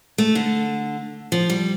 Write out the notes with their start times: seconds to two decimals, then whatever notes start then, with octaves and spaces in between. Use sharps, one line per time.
0.18 A3
0.35 D3
1.32 F3
1.50 G3